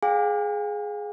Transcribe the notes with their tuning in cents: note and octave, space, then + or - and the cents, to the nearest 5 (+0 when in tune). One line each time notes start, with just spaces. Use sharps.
G#4 +10 F5 +35 G#5 -45